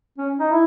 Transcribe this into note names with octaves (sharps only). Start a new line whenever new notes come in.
C#4
D#4
E4